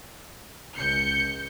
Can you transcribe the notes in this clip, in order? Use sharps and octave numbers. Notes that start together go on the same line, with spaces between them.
C#2 G6 C#7